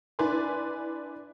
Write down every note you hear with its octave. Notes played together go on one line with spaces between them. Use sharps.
D4 E4 B4 D5 G#5 C6